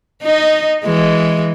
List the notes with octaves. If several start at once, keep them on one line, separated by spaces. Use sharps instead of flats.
D#4 D#5
E3 G#3